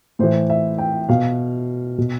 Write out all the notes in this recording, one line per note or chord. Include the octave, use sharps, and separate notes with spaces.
A2 E3 C5
E5
G5
B2 F5
B2